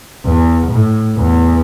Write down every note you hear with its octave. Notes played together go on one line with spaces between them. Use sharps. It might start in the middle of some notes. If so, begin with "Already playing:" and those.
E2
A2
E2